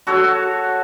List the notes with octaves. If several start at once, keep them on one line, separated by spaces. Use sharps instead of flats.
F#4 A4 C#5